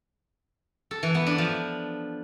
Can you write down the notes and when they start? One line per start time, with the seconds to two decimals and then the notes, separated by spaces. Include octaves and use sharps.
0.91 A4
1.03 E3
1.15 B3
1.26 D4
1.38 F3